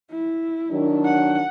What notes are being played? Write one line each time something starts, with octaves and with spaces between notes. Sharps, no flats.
E4
D#3 F#3 D4
F#5